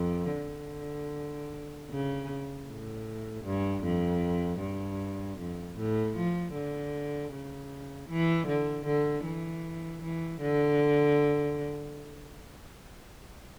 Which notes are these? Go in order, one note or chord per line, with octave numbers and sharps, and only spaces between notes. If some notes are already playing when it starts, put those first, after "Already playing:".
Already playing: F2
D3
C#3
A2
G2
F2
G2
F2
A2
F3
D3
C#3
E3
D3
D3
E3
E3
D3